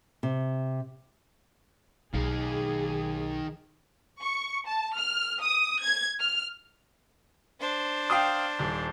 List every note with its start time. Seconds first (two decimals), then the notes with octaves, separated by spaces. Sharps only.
0.23 C3
2.13 B1 D#3 G#4 F5
4.21 C#6
4.67 A5
4.97 F6
5.43 D#6
5.83 G#6
6.20 F6
7.60 D4 C5
8.10 F5 G5 D#6
8.59 D#1